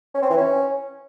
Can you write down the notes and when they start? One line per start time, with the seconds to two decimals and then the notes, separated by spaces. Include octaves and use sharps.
0.14 C#4
0.22 C4
0.30 E3
0.37 C#4